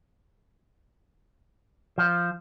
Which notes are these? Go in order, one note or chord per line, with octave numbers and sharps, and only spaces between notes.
F3